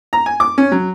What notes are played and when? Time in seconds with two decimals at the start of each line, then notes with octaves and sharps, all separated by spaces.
0.13 A#5
0.26 G#5
0.40 D6
0.58 C#4
0.72 F#3